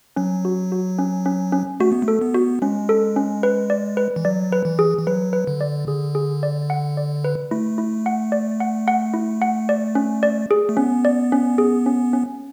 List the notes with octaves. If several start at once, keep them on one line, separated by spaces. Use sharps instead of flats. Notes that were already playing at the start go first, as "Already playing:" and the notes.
F#3 C#4
F#4
F#4
C#4
C#4
C#4
A3 F#4
B3
A3
A4
B3
F#4
G#3 C#4
A4
C#4
B4
D5
B4
E3
F#3 D5
B4
E3
G#4
E3
F#3 B4
B4
D3
D5
D3 G#4
G#4
D5
F#5
D5
B4
A3 E4
E4
F#5
D5
F#5
F#5
E4
F#5
D5
C#4
D5
G#4
A3
B3 C#4
D5
C#4
G#4
C#4
C#4